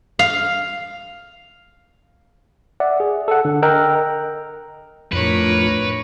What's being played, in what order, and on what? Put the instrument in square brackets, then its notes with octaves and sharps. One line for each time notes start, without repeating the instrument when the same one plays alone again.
[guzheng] F5
[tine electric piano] D5 E5 F#5
G#4
A4 F#5
D3
A#4 D#5 G5 A#5 E6 F#6
[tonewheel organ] F2 [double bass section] A2 [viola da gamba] D4 A#4 C#5 [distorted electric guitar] B4